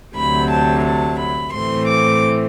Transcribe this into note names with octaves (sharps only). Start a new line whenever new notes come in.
D2 C3 F#3 B5
A5
A5
B5
A2 E3 A3 C4 C6
D6